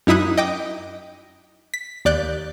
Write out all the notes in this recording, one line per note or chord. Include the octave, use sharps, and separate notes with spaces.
F#2 D#4 E4 E5 D#6 F#6
D#5 G5 D6
B6
D#2 D5 F#6 G6